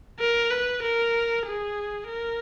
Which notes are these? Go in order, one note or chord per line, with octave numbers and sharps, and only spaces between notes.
A#4
B4
A#4
G#4
A#4